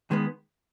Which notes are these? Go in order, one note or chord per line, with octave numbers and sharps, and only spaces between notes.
D#3 G#3 B3